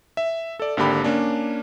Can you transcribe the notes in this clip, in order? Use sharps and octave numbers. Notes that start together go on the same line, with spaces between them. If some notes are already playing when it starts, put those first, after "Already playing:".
E5
A4 D5
G#1 D3 A#3 G4 B5
A#3 C#4 D4